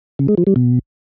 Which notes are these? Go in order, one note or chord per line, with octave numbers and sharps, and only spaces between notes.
C#3
G#3
F3
G3
B2